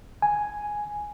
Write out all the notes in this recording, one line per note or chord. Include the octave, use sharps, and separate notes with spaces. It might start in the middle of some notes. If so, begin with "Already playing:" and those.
G#5